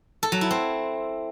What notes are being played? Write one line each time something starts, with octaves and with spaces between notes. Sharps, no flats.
A4
F#3
E4
C4